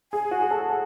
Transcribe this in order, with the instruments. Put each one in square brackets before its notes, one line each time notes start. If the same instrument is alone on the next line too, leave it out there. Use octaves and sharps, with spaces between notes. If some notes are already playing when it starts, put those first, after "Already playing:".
[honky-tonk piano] G#4 [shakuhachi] G#5
[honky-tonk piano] F#4
G#4
A4
A4